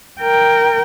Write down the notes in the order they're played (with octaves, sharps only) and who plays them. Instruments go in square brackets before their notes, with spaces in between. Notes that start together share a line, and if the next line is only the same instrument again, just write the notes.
[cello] A#4 G5